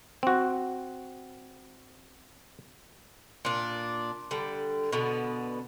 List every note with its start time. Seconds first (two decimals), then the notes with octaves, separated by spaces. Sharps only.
0.23 C4 F#4
3.45 A#2 D4
4.31 D3 G3
4.92 B2 D3 B3